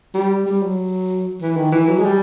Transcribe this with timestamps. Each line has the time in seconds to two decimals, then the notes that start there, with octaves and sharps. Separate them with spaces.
0.15 G3
0.46 G3
0.62 F#3
1.41 E3
1.57 D#3
1.72 E3
1.89 F#3
1.98 G#3
2.04 G3